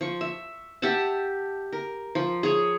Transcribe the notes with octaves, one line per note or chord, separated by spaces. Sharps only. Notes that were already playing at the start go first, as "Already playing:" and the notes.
F3 C#6
E5
G4 E5 F#5 A5
A#4
F3
G#4 C#5